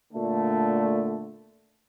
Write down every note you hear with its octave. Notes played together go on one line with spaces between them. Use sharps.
A#2 D3 A3